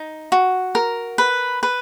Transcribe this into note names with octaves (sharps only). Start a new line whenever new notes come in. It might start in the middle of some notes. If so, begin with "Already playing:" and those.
Already playing: D#4
F#4
A#4
B4
B4